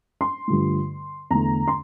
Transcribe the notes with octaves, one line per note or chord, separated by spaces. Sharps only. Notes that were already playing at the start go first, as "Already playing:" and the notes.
C6
G2 D3 F3 A3
E2 D3 A3 A#5
C6